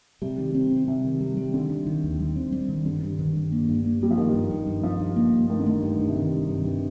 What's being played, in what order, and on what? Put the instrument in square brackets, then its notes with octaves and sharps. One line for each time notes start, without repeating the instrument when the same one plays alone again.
[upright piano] C3 [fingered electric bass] G3
[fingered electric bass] D#3
C4
G3
[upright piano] C3 [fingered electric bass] G3
[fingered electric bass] D#3
G3
G3
[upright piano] D3 [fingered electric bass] D#3
[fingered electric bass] G3
D#3
D#2
G3
C4
G3
D#3
[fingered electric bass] G2 [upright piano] D3
[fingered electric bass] G2
D#3
G2
A#3
G2
A#3
[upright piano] G3 [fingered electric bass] A#3
[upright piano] F3
[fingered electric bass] G2 [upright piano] D#3
[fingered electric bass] G2
G2
G2
[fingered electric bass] G2 [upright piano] F3
[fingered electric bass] G2
A#3
G2
[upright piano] D#3 [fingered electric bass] A3
[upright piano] D3
[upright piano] D#3 [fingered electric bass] A3
[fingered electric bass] G2
G2
[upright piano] C3
[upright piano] D3 [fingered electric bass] D#3
[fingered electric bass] G2
G2
G2